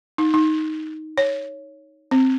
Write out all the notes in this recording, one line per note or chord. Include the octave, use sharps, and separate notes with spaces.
D#4
D#4
C#5
C4